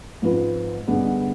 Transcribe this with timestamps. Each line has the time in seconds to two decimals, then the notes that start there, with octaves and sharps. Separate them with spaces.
0.22 G#2 F3 C4 F4 B4
0.88 G2 D3 G#3 B3 D4